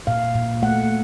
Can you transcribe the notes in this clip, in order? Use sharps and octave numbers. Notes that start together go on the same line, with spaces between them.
A#2 F5
A#2
A3 F#5